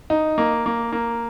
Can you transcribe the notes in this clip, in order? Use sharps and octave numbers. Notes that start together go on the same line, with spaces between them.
D#4
A#3
A#3
A#3